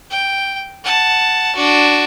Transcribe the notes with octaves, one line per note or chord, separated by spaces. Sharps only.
G5
F#5 A5
D4 F#4